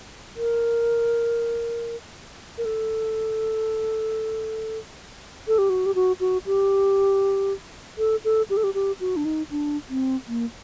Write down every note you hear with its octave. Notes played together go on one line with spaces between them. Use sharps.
A#4
A#4
A4
A4
G4
F#4
G4
F#4
F#4
G4
A4
A4
G4
A4
G4
G4
F#4
D4
D#4
D4
C4
A#3